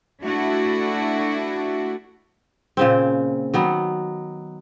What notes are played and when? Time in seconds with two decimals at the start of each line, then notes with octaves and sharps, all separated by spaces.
0.23 A3 D4 E4 F#4
2.77 A#2 C#3 C4
3.54 D#3 F#3 B3